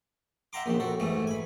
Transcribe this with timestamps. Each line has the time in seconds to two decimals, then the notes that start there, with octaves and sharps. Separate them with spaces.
0.53 E5 F#5 G5 A#5 C6 D6
0.66 A#1 D#2 G4
0.80 F#4 A4
1.00 G#2 E3 A3
1.27 G#5 B5